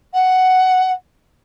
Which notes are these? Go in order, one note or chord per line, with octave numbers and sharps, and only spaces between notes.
F#5